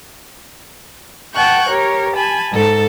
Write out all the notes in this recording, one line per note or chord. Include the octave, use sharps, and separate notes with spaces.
F#5 G5 A5 C#6 F#6 G6
G4 A#4 C#5
G#5 A5 B5
G#2 A4 A5